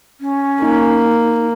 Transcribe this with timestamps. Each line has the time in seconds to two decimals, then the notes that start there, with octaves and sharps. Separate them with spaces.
0.20 C#4
0.62 A#3 D#4